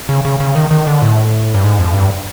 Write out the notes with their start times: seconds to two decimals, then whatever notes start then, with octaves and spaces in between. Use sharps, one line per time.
0.09 C#3
0.25 C#3
0.40 C#3
0.55 D#3
0.71 D#3
0.87 D3
1.02 A2
1.55 G2
1.63 G#2
1.79 F2
1.94 G2